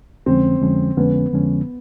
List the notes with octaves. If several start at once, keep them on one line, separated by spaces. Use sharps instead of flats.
F2 D3 F3 G#3 C4 C#4
F2 D3 F3 G#3 C#4
F2 D3 F3 G#3 B3 C#4
F2 D3 F3 G#3 C#4